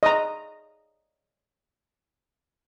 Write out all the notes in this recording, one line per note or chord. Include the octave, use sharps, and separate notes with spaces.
D#5 A#5